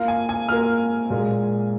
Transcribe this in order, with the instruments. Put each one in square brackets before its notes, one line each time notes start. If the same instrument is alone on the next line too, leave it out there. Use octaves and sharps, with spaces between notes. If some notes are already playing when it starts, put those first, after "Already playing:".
Already playing: [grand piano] A#3 F4 A#4 [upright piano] F5
[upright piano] G#5
G#5
[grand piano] A#3 F4 A#4 [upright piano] F6
[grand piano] A#2 G#3 F4 A#4